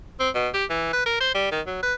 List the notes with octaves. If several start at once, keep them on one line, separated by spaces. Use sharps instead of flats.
C4
B2
G4
E3
B4
A#4
C5
G3
D#3
F#3
B4